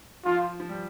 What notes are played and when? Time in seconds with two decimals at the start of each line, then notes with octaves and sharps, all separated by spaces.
0.25 F3 F4
0.60 F3
0.69 G3